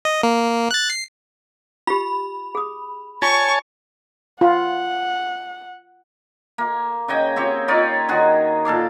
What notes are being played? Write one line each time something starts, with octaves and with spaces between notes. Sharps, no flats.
D#5
A#3
F#6 A6
C7
F4 G4 B5
G#4 D#6
F4 C#5 G#5 A5 C#6
F4 F#5
A#3
C#3 C#5 D#5 G5
C4 G4 C#5
D#4 F4 C#5 D5
D#3 F#4 G#4
A#2 A4 F5 D6